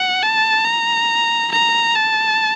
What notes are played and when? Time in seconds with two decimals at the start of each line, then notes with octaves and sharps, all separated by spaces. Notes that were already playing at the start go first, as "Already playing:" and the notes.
Already playing: F#5
0.22 A5
0.65 A#5
1.52 A#5
1.95 A5